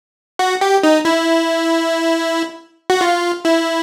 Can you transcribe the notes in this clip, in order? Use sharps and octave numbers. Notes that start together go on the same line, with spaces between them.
F#4
G4
D#4
E4
F#4
F4
E4